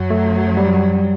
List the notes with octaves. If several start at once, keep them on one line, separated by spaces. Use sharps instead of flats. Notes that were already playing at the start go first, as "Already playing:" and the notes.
Already playing: F#2 F#3
A3
G3